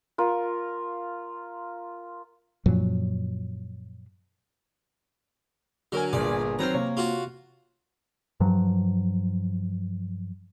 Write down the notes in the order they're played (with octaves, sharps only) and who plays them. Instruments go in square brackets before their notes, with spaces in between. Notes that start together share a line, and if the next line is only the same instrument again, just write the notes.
[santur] F4 A#4
[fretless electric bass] F#2 A#2 F3 F#3
[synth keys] D3 A#4 G#5 [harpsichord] F#3
[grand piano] G1 A#2 [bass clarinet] G#4 [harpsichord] D5
[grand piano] D#3 F#3 C4 [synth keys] B4 C5 F6 [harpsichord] A#5
[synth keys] C3 [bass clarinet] A#3 [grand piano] C#5
[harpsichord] F4 F#4
[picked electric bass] G2 F3 F#3